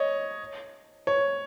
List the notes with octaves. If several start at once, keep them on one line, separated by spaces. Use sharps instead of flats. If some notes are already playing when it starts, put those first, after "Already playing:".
Already playing: C#5 D#5
C#5